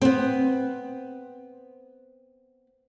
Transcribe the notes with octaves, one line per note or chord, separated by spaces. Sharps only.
B3 C4